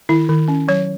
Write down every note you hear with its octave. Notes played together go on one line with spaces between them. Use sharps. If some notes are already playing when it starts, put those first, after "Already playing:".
D#3 E4
D#3
C#4
F#3 C#5